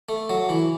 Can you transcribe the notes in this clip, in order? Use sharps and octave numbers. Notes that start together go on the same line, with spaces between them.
A3
F#3
E3